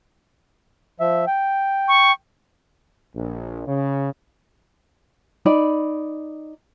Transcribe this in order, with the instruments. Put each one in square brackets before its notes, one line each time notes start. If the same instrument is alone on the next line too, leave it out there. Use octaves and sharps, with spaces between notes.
[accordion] F3 E5
G5
[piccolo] C#6
[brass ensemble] A#1
C#3
[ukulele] D#4 D5 B5